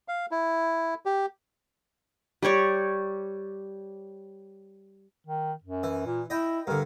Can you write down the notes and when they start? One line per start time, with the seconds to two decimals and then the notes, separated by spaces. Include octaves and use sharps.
0.08 F5
0.31 E4
1.06 G4
2.42 G3 G4 C#5 D5
5.27 D#3
5.64 F#2
5.83 E3
6.06 A#2
6.30 E4 D#5 G5
6.67 G2 D3 A#4